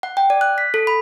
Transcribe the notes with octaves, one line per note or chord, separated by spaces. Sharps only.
F#5
G5
D5
F#6
B6
A4
B5